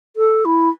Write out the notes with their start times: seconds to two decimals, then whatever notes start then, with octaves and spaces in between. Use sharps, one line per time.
0.16 A4
0.45 E4